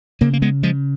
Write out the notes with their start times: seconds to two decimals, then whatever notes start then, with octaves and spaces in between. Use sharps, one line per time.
0.21 C#3 A#3 C#4
0.33 A#3
0.42 G#3 B3
0.63 C#3 F3 G#3